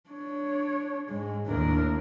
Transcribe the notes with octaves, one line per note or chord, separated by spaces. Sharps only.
D4 C#5
G#2 G#3
D#2 A2 D4 A#4